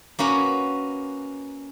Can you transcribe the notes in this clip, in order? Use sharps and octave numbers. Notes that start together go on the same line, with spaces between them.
A#3 C#4 F#4 B4